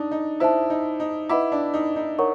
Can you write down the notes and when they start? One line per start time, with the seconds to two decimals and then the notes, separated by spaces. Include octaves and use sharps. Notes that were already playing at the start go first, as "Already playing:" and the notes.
Already playing: D4 D#4
0.11 D#4
0.40 E4 C5 E5 A5
0.70 D#4
1.00 D#4
1.29 E4 B4 D#5 F#5 B5 D6
1.52 D4
1.74 D#4
1.96 D#4
2.19 A#4 C#5 F#5 A#5 C#6